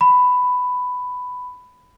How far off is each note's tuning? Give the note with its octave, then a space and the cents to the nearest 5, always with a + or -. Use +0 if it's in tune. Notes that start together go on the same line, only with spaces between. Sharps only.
B5 +10